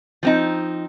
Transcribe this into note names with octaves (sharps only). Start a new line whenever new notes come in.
F3 C4 D#4